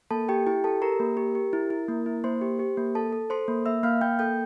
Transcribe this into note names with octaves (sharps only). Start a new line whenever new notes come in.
A#3 A4 A5
G4 G5
E4 G4 G5
G4 A4 A5
G4 A#4 A#5
A#3
G4
G4
E4
E4
A#3
E4
A#3 C5 C6
G4
G4
A#3
A4 A5
A4
A4 C5 C6
A#3
A#3 E5 E6
A#3 F5 F6
A#3 G5 G6
A4 G5 G6